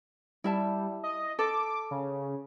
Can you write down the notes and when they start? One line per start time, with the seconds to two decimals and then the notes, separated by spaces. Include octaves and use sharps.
0.44 G3 E4 E5 A5
1.03 D#5
1.39 A4 D6
1.91 C#3